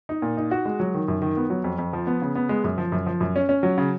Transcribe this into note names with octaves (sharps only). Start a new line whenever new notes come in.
D#4
A#2
D#4
F#4
G#3
F#3
D#3
F#2
D#3
B3
F#3
F2
F2
F3
B3
C#3
B3
G#3
F#2
F3
F#2
F3
F#2
C#4
C#4
F#3
C#3